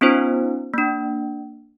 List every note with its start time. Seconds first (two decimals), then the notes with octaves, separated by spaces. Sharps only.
0.01 B3 C#4 D#4 F4 C5
0.74 A#3 D4